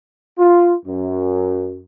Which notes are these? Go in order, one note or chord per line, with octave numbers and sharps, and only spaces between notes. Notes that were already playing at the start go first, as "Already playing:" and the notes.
F4
F#2